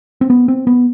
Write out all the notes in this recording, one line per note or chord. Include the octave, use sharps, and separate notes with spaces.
C4
B3
C4
B3